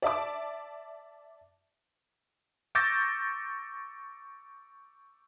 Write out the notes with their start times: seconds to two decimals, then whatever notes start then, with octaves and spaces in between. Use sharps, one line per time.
0.02 D5 E5 A5 D6
2.75 C#6 D6 E6 G6 A6 A#6